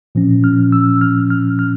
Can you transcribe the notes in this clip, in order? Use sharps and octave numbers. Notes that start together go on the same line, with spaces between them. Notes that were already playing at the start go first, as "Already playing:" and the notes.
A#2 F3 C#4
F6
E6
F6
F6
F6